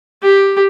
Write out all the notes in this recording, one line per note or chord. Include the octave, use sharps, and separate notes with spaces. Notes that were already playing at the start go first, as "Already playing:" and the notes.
G4